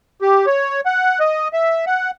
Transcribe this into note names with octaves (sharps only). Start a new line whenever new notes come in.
G4
C#5
F#5
D#5
E5
F#5